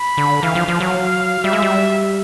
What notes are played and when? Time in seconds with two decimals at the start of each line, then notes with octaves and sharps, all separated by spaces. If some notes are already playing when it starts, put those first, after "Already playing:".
Already playing: B5
0.18 D3
0.43 E3 F5
0.55 F3
0.68 F3
0.81 F#3
1.44 G3 E5
1.53 G#3
1.62 G3